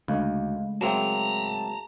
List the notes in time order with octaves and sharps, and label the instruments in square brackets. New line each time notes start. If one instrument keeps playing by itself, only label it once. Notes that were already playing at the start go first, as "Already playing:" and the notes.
[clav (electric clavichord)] D2 [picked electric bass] C#3 G#3 A3 [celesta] D#5 F5 B5
[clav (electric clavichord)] F#3 A#3 C4 [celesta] F#4 G#4 E5 [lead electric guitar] A5 A#5